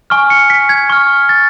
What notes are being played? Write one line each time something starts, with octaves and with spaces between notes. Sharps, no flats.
G#5 C#6 F6
C#7
B6
G#6
C#6 F6
A6